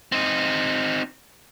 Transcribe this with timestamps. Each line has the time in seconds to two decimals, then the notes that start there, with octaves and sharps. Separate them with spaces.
0.12 C4 D#4